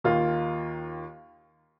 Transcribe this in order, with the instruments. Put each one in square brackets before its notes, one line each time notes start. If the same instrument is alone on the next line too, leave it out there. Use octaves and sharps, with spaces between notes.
[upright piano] D#2 D#3 A#3 F4